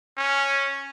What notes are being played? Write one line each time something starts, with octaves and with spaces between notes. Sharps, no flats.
C#4